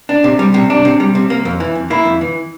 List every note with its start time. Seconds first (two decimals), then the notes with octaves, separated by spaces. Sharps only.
0.09 D4
0.24 C3
0.39 G3
0.54 C3
0.70 D4
0.85 C3
1.00 G3
1.15 C3
1.30 A#3
1.45 F2
1.60 E3
1.75 F2
1.90 A#3 E4
2.05 F2
2.21 E3